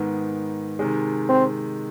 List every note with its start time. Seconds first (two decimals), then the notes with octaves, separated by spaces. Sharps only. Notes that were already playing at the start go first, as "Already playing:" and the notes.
Already playing: G#2 D#3 B3
0.79 C3 D#3 G#3
1.29 C4